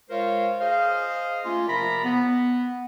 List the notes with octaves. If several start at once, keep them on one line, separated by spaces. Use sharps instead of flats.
G#3 F4 A#4 C5 C#5 F5
G#4 C5 D#5 F5
A3 A#3 C#4 F4
C3 F3 A#4 D5 A#5 B5
B3